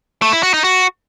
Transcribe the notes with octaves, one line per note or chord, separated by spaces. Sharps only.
A3
E4
F#4
D#4
F#4